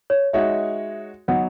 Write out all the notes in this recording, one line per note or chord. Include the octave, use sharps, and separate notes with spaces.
C#5
G#3 D#4 F#4 C#5 E5
F#3 B3 D#4 F#5